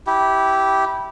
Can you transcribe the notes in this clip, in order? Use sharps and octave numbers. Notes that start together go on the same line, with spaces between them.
E4 G4